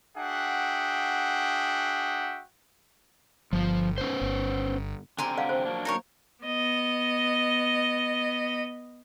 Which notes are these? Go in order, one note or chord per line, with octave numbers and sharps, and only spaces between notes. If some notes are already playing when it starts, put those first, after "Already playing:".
D4 F#4 G#4 E5 F#5 G5
G1 F3 F4
C#4 B4 C5
G1
D3 C4 G4 G#5 A#5 C6
D5 F5 F#5
C5
F#3 A#3 D4
D#4 A#4 C#5
B3 D#5